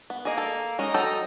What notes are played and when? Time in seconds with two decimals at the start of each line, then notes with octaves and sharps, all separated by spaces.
0.10 B3
0.25 A#3 G#4 D#5
0.38 A4
0.79 G#3 C#4 D#4 D#5
0.94 F#3 A4 G5